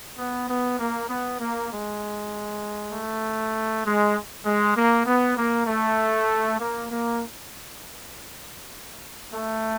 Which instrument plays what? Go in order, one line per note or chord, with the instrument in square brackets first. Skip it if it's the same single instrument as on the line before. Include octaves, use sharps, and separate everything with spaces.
[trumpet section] B3
B3
A#3
B3
A#3
G#3
A3
G#3
G#3
A#3
B3
A#3
A3
A#3
A#3
A3